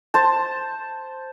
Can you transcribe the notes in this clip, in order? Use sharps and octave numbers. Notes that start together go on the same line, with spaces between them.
C5 A5